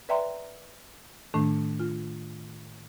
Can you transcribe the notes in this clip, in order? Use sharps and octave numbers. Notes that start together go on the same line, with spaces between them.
B4 D5 E5 G5 A#5 C6
A2 D#3 A3 D4
F4